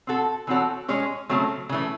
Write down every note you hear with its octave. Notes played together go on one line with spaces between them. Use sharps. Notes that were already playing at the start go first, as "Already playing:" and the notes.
C4 F#4 A4
E3 C4 F#4 A4 C#5
G#3 C#4 G#4 C#5
C#3 F#3 A3 C4
C#3 E3 A3